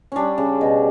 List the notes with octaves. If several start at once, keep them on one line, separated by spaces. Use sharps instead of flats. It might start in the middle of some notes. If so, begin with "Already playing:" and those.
G3 C#4 D4
C#3
B2